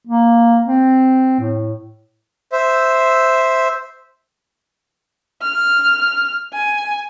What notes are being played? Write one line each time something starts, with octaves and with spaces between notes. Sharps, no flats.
A#3
C4
A2
C5 E5
F6
G#5